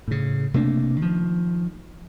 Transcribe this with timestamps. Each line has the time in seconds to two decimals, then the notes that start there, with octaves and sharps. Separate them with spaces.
0.08 A2 C#3
0.54 C3 A3 A#3 D4
1.02 D#3 F3